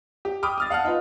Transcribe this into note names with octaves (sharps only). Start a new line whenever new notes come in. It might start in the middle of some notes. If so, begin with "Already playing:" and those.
G4
G5 B5 D6 D#6 F6
D#6 F6 A6
F5 F#5 A5 F6
D#4 F4 B4